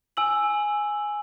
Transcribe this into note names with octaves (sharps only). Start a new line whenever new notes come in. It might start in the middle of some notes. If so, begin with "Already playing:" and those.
G#5 E6 F#7